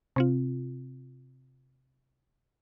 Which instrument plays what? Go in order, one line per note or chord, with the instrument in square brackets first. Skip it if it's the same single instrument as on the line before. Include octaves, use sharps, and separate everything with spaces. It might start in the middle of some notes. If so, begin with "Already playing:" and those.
[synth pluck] C3 C4 F4